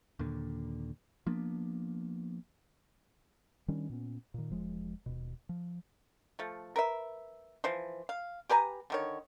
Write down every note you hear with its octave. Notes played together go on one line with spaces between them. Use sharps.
D#2 A#2 D3
F3 A#3 B3 D4
D#3 G3 C#4 D4
A#2 B3 C#4
A#2 D#3
E1 F3 G#3
D#1 B2
F3
F3 A3
A#4 B4 E5
E3 F3 C5
F5
G4 B4 G#5 A#5
D3 D#3 C#5